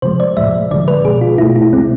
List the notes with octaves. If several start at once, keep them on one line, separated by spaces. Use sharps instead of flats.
C3 F3 G#3 C5
D5
A2 F3 G#3 E5
D3 F3 G#3 D5
B4
B2 G#3 G#4
F4
B2 A3 E4
E4
C3 G#3 C4